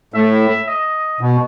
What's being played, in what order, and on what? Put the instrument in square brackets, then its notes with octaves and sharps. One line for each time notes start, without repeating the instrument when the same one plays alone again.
[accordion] A2 [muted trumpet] E5
[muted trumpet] D#5
[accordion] B2